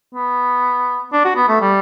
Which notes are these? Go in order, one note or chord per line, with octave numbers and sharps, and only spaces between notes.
B3
D4
F#4
B3
A3
G3